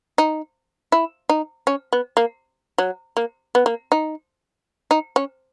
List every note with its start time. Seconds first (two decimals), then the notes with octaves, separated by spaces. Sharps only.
0.18 D#4
0.92 E4
1.29 D#4
1.67 C#4
1.93 B3
2.17 A#3
2.78 F#3
3.17 A#3
3.55 B3
3.66 A#3
3.92 D#4
4.91 D#4
5.16 C#4